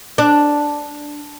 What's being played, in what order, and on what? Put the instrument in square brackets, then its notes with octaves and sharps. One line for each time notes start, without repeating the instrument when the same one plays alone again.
[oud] D4